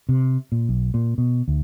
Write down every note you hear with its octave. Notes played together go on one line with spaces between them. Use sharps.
C3
A#2
B1
A#2
B2
D2